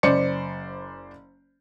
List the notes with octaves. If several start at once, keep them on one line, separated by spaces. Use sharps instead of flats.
F#1 C5 D5 C#7